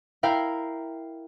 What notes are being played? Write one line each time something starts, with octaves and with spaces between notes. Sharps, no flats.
E4 A#4 F5 G5